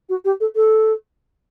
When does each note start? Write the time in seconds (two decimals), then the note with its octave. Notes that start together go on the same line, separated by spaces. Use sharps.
0.09 F#4
0.24 G4
0.40 A4
0.55 A4